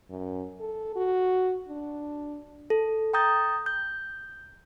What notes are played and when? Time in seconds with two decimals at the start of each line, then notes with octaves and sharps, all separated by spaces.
0.10 F#2
0.60 A4
0.96 F#4
1.69 D4
2.70 A4
3.13 G5 A#5 D#6 G6 A6
3.66 G6